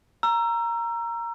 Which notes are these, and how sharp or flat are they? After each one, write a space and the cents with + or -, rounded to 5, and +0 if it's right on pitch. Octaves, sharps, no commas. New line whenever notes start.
A#5 +0 E6 +30